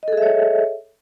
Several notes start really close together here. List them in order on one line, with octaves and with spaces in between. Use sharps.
D#5 A4 G#4 E5 C#5